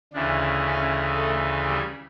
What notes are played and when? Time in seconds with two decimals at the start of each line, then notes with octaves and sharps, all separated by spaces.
0.13 D2 C#3 E3 D4
0.64 C#4
1.15 A3
1.67 G3